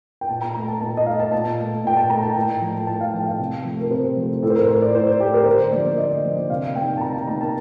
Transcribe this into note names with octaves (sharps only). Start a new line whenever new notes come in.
G5
A#2 A5
A#5
A3 A#5
A5
A#2 A5
D#5
A3 F5
A5
A#2 A5
A3
A#2 G5
A5
A3 A#5
A5
A2 G5
F3 A3
A2 A5
F5
F3 A3 G5
F5
C3
F3 A3
A#4
C3 C5
F3 A3
A2 A4
C5
A#4
A3 C5
D5
A2 C5
A3 G4
A#4
D3 C5
F3 A#3 D5
D3 D#5
F3 A#3
C3 F5
F5
D#3 A#3 G5
A5
C3 A#5
A5
D#3 A#3 A#5
A5